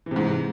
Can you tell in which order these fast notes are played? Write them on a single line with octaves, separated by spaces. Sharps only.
E3 C3 G#2